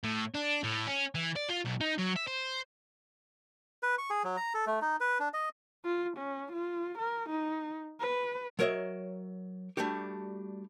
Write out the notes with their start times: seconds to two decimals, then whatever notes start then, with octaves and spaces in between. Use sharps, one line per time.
0.03 A2
0.34 D4
0.64 A2
0.87 C#4
1.15 E3
1.36 D5
1.49 F4
1.65 B1
1.81 D#4
1.98 F#3
2.16 E5
2.27 C5
3.83 B4
3.98 C#6
4.10 G#4
4.24 F#3
4.37 A#5
4.54 A4
4.67 A3
4.82 D#4
5.00 B4
5.20 D4
5.34 D#5
5.85 F4
6.17 C#4
6.53 F4
6.99 A#4
7.30 D#4
8.01 B4
8.59 F#3 A#4 C#5 D#5 E5
9.77 G3 A3 D4 F#4 G4